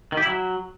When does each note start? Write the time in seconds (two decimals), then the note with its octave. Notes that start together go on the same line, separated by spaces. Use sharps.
0.12 D#3
0.17 G4
0.22 E4
0.27 F#3